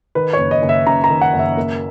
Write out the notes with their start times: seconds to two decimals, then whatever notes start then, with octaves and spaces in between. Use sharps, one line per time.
0.15 D#3 B4
0.33 C#5
0.39 F#1
0.51 D#5
0.62 F#1
0.69 E5
0.86 F#2 A#5
1.04 A#5
1.10 D#3
1.21 F#5
1.33 F#1
1.39 E5
1.57 A#3